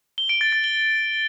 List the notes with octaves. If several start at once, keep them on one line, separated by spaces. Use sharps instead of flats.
G7
D7
A6
A6
G7